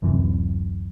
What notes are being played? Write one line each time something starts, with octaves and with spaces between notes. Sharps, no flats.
D1 F#2 C3 E3